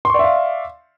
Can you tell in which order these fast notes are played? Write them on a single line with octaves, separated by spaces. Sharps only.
C6 C#6 D5 E5 F5